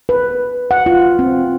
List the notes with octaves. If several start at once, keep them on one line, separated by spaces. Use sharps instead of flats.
B4
F#5
F4
C4